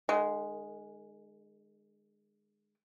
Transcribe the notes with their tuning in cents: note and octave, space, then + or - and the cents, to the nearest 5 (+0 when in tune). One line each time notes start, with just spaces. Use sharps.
D#3 -45 G#3 +0